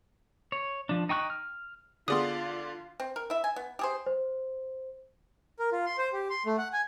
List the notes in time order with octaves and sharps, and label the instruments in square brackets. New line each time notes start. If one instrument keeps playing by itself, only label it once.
[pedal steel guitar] C#5
F3 D4
D#4 G5 C#6 F#6
F6
[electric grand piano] D3 D5 C6 [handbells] B3 G#4 D#6 [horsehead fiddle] F4
[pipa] C4
A#4
E4 E5
G#5
B3
G4 G#4 C5
[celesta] C5
[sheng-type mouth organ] A#4
F4
C6
C5
G4
C6
A3
F#5
G#5